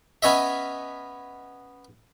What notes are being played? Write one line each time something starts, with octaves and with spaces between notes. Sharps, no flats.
B3 C#4 C#5 D#5 E5